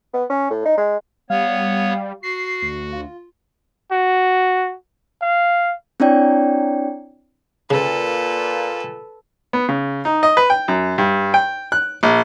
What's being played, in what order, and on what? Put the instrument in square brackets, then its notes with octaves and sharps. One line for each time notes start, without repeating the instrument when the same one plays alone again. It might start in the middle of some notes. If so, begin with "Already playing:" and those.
[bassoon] B3
C#4
A2
D#4
G#3
[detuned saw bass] G3 [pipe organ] B3 C#5 [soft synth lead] F5
[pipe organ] F#4 [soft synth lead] C7
[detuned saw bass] D2
[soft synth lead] F4
[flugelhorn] F#4
F5
[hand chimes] C4 D4 E4 C#5 D5 G5
[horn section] A#2 [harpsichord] C#3 [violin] A4 B4
[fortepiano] B3
C#3
D#4
D#5
B4
G5
F#2
G2
G5
F#6
A#1